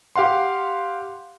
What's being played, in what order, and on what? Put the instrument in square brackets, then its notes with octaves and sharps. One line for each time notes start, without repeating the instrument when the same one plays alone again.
[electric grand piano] G4 F5 F#5 C6